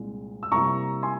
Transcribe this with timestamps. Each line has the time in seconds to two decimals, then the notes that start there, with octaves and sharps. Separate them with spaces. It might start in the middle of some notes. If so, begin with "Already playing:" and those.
Already playing: C2 A#2 G#3
0.43 E6
0.52 C3 G3 A#3 E4 A#5 C#6
1.03 G#5 C6